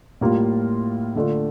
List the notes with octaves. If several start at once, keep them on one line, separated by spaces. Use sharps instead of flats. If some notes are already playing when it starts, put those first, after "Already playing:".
A2 G3 A#3 F4
D3 A3 D4 F4